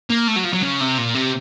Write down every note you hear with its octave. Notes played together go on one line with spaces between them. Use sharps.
A#3
A3
F#3
F3
F#3
C#3
C3
A#2
C3